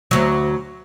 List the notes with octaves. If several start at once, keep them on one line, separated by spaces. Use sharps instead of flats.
D2 F#3